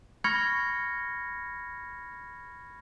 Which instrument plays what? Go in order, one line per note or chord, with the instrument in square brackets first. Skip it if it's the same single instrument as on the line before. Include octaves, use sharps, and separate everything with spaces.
[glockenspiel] B5 C#6 F6 G#6 A#6 C#7